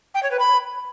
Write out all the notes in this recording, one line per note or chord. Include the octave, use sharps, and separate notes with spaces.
G5
C#5
B4
B5